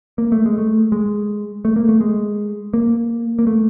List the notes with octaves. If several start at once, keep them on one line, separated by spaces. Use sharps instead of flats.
A#3
A3
G#3
A3
G#3
A3
A#3
A3
G#3
A#3
A#3
A3